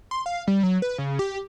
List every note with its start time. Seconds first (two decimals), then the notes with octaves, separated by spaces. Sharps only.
0.11 C6
0.26 F5
0.47 G3
0.63 F#3
0.82 B4
0.98 C#3
1.19 G4